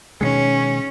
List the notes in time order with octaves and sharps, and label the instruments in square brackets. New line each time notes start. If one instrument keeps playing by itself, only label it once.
[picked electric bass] B2 D#3 G#3 [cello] C#4